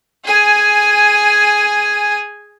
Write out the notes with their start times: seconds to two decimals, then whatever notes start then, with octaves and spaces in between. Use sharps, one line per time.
0.25 G#4 G#5